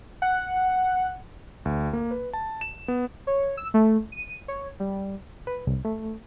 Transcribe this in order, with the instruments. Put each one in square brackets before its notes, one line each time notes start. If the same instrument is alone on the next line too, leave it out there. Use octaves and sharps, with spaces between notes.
[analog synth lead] F#5
[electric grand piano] D2
A#3
B4
A5
E7
B3
[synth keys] C#5
E6
A3
D#7
C#5
G3
[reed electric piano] B4
C2
A3